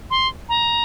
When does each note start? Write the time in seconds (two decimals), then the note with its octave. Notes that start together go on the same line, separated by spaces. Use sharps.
0.11 C6
0.49 A#5